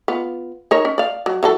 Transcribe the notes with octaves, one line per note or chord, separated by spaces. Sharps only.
B3 F4
D#4 A#4 C#5
C#4
D5 F5
F#3
E3 F#3 A4